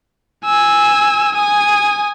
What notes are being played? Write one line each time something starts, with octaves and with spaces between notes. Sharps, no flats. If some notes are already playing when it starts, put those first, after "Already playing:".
G#5 E6
G#5 D#6